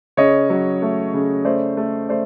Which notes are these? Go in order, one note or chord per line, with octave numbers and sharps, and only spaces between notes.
C#3 C#5 D#5
F#3
A3
C#3
A3 C5 D5
A3
A3 C5 D5